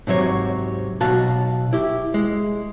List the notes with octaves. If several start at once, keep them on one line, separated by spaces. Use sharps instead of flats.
G#2 C3 F#3 C#5
B1 B2 F#4 F5 A5
E4 G4
G#3